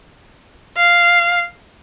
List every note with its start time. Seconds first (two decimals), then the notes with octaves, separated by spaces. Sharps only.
0.77 F5